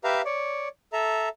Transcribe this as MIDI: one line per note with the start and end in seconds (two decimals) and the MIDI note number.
0.04 0.22 67
0.04 0.22 71
0.04 0.22 76
0.04 0.22 77
0.04 0.22 82
0.25 0.68 73
0.25 0.68 74
0.93 1.29 69
0.93 1.29 76
0.93 1.29 82